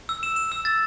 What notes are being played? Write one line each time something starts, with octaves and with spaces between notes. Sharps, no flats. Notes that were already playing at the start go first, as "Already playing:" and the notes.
E6
E7
E7
E6
A6